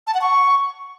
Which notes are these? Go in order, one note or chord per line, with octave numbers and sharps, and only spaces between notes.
A5
F#5
C#6